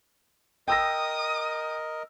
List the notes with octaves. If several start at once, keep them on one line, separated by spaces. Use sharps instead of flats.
A#4 D#5 G5 D#6 E6 A#6